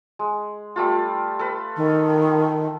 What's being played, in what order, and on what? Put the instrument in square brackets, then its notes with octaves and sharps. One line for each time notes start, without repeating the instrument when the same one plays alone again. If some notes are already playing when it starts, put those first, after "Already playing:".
[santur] G#3
G3 A3 F4
A4 B4
[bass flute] D#3